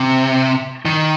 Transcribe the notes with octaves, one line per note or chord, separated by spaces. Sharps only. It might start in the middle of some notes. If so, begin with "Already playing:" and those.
Already playing: C3
D#3